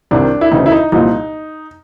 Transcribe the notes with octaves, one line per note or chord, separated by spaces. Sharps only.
C2 C3 D#3 D4
E4
D2 C#3 E3 D#4
E4
D#4
C2 A#2 F3 D#4